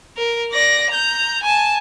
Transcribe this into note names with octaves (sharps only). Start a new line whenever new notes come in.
A#4
D5 A#6
A#5 G6
G#5 A5